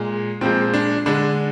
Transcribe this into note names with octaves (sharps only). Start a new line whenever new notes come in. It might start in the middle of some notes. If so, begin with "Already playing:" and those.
Already playing: A#2 G#3
A#2 F3 G#3 C4
D4
D3 G#3 D4